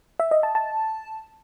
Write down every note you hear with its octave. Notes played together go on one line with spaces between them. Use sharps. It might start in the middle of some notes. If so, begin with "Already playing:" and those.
E5
D#5
A5
A5